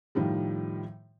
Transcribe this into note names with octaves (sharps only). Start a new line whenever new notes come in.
A2 D#3 F3 G3